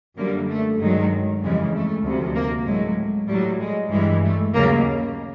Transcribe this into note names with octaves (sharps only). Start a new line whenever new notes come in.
F#2 D3 G3 A#3
A3
G2 D#3 F#3 G#3
F2 C#3 E3 G3 G#3
A3
D2 C3 F3
A#3
A2 F#3 G#3
A2 F#3 G3
G#3
G2 E3 G3 G#3
A3
D#2 C#3 F#3 A#3